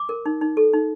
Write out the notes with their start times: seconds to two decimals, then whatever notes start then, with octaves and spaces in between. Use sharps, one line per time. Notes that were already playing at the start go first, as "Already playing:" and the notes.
Already playing: D6
0.09 A#4
0.26 D#4
0.41 D#4
0.57 A4
0.73 D#4